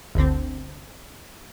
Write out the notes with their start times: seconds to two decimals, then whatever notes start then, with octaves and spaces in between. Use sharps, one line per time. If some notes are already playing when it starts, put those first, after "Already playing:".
0.15 G1 D2 D3 C4